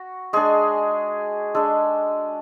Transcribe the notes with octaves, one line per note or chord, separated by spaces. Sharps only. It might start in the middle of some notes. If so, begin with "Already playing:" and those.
Already playing: F#4
G#3 D4 G#4
G#3 D4 A4